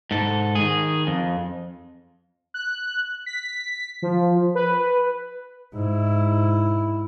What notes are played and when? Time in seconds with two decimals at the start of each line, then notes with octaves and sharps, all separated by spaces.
0.11 G#2 A4
0.55 D#3 G#4
1.07 F2
2.54 F#6
3.26 B6
4.02 F3
4.55 B4
5.74 G#2 E4